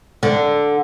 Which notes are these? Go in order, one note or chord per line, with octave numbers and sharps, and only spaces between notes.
D3